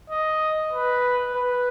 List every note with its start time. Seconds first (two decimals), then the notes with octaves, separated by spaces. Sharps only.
0.10 D#5
0.73 B4
1.34 B4